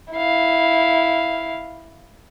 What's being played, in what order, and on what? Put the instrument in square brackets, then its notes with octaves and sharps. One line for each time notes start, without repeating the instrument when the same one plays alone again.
[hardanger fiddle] E4 F5